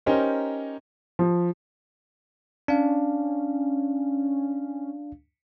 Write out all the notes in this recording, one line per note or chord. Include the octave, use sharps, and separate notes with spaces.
C#4 D#4 G4 A#4 C5
F3
C#4 D4 F5